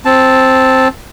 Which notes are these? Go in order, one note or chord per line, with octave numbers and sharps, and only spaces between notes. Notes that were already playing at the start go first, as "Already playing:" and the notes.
C4 A5